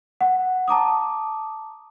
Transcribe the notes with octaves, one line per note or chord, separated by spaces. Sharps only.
F#5
A5 A#5 D6 D#6